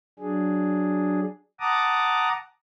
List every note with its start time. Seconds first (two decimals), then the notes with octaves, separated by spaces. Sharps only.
0.19 F#3 D4 G#4
1.60 F#5 A5 A#5 D6 D#6